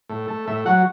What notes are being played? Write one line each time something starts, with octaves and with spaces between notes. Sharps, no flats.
A2
A3
A2 E5
F#3 F#5